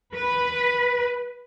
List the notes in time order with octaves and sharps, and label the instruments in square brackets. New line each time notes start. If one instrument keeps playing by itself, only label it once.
[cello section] B4